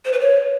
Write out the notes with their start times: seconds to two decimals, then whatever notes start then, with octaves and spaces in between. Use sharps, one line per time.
0.05 C5
0.12 B4
0.20 C#5